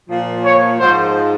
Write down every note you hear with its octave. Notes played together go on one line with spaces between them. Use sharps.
A#2 F3
C#5
G#2 F3 C5